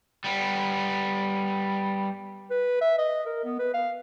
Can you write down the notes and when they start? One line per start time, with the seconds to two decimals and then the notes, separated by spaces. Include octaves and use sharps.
0.24 G3 B3
2.51 B4
2.81 E5
2.98 D#5
3.26 A#4
3.44 B3
3.59 B4
3.74 F5